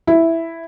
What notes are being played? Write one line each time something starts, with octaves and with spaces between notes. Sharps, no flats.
E4